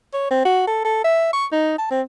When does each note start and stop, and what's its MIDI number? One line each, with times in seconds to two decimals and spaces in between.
0.13 0.30 73
0.31 0.44 60
0.45 0.65 66
0.67 0.81 69
0.85 1.00 69
1.04 1.28 76
1.33 1.46 85
1.52 1.77 63
1.78 1.89 81
1.91 2.01 60